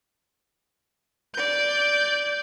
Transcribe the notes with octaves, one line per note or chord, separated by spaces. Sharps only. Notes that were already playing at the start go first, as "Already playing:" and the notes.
D5 G6